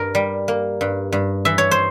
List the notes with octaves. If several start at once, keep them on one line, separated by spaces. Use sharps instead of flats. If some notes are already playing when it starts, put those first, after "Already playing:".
Already playing: G2 A#4
G3
A#3
G2
G2
E3 E5
C#5
C5